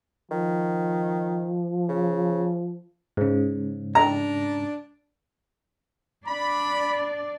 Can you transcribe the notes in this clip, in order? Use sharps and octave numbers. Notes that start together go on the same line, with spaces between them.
D#3 F3
C#3
G#2 C#3
D4 A#5
D4 D5 B5